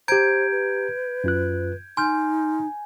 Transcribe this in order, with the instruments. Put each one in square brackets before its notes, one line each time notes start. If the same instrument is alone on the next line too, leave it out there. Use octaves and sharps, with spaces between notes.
[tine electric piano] G4 A#5 [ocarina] C5 [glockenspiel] G6 G#6 D7
[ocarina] B4
[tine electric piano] F#2 F4 F#6
[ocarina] D#4 [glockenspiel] G#5 [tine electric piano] C6 F6 G6